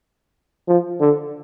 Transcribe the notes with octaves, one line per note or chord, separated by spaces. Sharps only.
F3
D3